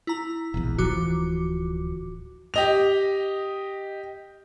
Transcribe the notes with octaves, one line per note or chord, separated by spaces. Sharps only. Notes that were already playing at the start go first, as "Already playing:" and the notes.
E4 A#5
E1 A#1 E2
D1 E3 F3 F#4 D6
G4 D#5 F7